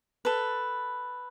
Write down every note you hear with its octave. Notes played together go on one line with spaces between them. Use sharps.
A4 B4